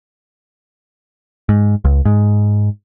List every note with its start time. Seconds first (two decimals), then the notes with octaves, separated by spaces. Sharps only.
1.49 G#2
1.85 C#2
2.05 G#2